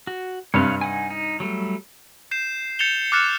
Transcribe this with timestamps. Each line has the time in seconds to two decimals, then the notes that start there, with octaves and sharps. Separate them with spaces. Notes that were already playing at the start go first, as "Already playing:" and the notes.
0.07 F#4
0.54 G2 C3 C#5 F5 F#6
0.81 D#4 F#5 G#5
1.10 D#4
1.40 F#3 G3 A3
2.31 G6 C7 E7
2.79 G6 A6 C#7 E7 F7 G7
3.12 D6 F6 F#6 A6 C#7 E7